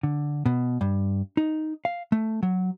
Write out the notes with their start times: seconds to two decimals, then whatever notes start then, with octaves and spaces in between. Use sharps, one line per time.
0.03 D3
0.46 B2
0.81 G2
1.37 D#4
1.85 F5
2.12 A3
2.43 F#3